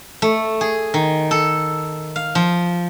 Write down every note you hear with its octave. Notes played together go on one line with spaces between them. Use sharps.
A3
G#4
D#3
A4
F5
F3